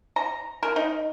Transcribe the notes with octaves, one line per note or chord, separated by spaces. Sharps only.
A#5
A#4
D#4